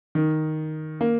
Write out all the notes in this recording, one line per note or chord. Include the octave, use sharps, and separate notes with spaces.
D#3
A#3